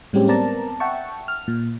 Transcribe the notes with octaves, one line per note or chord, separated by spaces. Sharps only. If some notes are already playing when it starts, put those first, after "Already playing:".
A2 G3 G#3 C4 C#4 G4
B3 C4 A#4 D5 A5 A#5
E5 F#5 G5 A5 C#6
F6
A#2